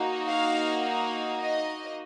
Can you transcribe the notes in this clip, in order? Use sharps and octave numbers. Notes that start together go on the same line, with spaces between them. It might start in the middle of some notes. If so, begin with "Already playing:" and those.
Already playing: A#3 D#4 F#4
F5
F5
D#5